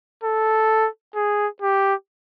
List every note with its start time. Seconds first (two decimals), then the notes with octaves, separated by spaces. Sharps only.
0.23 A4
1.15 G#4
1.62 G4